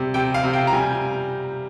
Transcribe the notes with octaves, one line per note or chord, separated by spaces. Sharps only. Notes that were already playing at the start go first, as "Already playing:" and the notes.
Already playing: C3 G3
C3 G5
F5
C3
G5
A#5
G3 G#5